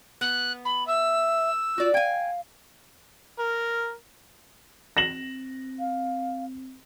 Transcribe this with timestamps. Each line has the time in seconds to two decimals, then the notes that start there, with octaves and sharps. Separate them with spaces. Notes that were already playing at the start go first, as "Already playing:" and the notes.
0.21 B3 F#6
0.65 B5
0.87 E5 E6
1.78 F4 F#4 D5
1.94 F5 G5 G#5
3.39 A#4
4.97 C4 A#6 E7 F#7
5.79 F5